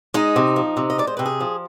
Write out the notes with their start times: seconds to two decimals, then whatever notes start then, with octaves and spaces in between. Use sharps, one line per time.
0.14 G#3 D#4
0.36 C3
0.56 F3
0.77 C3
0.90 D#5
0.98 G#3 D5
1.07 C5
1.17 C3 B4
1.26 G#4
1.40 F3